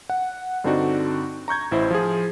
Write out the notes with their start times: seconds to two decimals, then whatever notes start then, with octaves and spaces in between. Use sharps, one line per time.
0.10 F#5
0.64 G2 D3 C4 D4 D#4 F#4
1.48 A#5 C#6 G6 G#6
1.71 A1 E4 C5
1.90 F3 F4 G#4